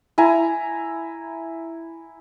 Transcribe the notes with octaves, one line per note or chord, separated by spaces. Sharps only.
E4 G#5 A#5